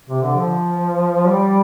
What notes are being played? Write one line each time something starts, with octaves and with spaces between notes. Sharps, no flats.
C3
D3
F3
G3